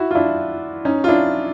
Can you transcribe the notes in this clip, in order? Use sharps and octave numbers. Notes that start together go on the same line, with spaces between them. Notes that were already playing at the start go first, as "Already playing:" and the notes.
Already playing: E4 F#4
F4
D4 E4
C#4 D#4
F4
D4 E4